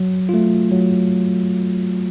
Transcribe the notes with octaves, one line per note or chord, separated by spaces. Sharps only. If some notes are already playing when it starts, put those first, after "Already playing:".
Already playing: F#3
A3 F4
F#3